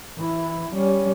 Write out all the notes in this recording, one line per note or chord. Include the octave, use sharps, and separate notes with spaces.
E3 E4
G3 C#4